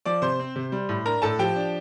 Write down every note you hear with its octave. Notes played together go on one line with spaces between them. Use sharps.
F3 D5 D6
C3 C5 C6
C4
C3
G3
A2
D4 A#4 A#5
A2 A4 A5
F3 G4 G5
D4